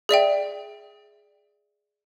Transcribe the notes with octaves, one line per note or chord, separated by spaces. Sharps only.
G#4 D5 E5 G5